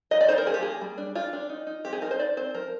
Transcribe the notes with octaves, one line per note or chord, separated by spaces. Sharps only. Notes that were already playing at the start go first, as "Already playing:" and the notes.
D#4 D#5
D5
D#4 C5
A#4
F3 G#4
G4
A#3 G#4
G3
D4
D4 F4
D4
D#4
D#4
C4 G4
G#4
D#4 A#4
C5
D#4 D5
C4 C5
F3 A#4